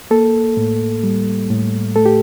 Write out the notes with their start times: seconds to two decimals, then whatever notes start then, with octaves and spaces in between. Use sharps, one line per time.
0.11 A#3 A4
0.57 A2
1.03 G3
1.50 A2
1.96 A3 A4
2.06 G4